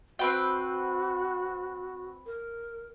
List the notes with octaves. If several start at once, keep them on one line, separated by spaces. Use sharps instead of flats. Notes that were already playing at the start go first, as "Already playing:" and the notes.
C4 F#4 B4 G5
A#4